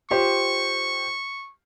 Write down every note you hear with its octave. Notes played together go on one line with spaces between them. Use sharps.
F4 G4 C5 C#6